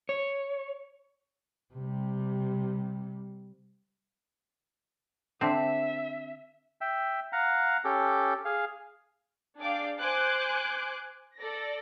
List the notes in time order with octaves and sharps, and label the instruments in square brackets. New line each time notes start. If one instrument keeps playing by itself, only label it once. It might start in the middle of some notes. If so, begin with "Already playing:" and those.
[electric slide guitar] C#5
[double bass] C3 G3
[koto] D3 C4 [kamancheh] E5
[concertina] E5 G5
F5 F#5 A#5
C#4 G4 A4
G#4 F5
[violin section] D4 G#4 D5 F5 G5 D6
C5 G#5 D6 F#6 G6
A4 D5 A#6